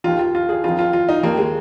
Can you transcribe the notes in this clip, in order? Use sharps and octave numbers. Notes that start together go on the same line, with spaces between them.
D#2 D#3 F4
F4
F4
G#4
F2 D#3 F4
F4
F4
D#4
D#2 D#3 A#3
G#3